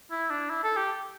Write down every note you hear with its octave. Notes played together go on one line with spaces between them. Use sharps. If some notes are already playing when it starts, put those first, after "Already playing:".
E4
D4
E4
A4
G4